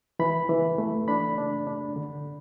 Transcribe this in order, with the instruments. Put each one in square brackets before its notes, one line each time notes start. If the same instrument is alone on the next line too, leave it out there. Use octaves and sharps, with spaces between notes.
[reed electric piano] E3 B5
E3
A3
D4 B5
D4
D4
D3